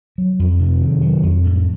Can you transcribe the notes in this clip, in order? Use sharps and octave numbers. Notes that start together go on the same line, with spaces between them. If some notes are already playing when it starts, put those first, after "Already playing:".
F#3
F2
C3
D#3
F#3
F2
A2